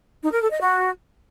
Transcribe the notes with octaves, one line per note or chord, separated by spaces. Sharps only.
D#4
A#4
A4
D#5
F#4